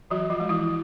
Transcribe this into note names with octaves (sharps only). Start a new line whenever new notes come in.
E3 F#3 F#4
F3 F4
G#3
E3 E4